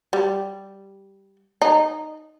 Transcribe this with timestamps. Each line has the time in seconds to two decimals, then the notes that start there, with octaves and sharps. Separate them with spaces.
0.13 G3
1.62 D#4